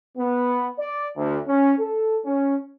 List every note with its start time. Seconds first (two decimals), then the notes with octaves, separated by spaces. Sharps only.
0.18 B3
0.79 D5
1.17 D2
1.47 C#4
1.79 A4
2.25 C#4